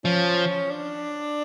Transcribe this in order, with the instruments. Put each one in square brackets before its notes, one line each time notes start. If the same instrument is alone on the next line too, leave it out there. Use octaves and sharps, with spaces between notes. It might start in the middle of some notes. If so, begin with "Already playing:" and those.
[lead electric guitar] F3 [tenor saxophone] C#4
[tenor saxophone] D4